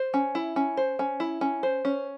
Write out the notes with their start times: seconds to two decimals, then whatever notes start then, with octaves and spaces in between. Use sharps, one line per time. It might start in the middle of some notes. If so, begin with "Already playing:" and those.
Already playing: C5
0.14 C#4
0.35 E4
0.56 C#4
0.77 C5
0.99 C#4
1.20 E4
1.41 C#4
1.63 C5
1.85 C#4